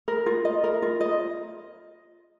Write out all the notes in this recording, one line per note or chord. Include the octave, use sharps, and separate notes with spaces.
A#4
F4
D#5
A#4
F4
D#5